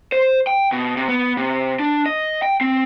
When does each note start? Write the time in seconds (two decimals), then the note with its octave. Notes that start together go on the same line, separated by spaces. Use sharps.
0.12 C5
0.47 G5
0.72 B2
0.97 C3
1.08 B3
1.37 C3
1.79 D4
2.06 D#5
2.43 G5
2.61 C4